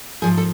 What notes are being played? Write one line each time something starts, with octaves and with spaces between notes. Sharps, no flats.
G#2 F3 G#4
A4